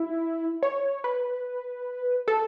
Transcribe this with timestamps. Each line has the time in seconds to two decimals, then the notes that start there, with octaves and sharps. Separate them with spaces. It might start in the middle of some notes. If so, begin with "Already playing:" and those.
Already playing: E4
0.63 C#5
1.04 B4
2.28 A4